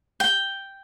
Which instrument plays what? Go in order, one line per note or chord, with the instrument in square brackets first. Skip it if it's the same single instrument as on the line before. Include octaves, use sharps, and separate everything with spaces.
[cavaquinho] G5